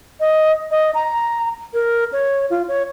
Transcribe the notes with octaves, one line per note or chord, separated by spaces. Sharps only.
D#5
D#5
A#5
A#4
C#5
F4
C#5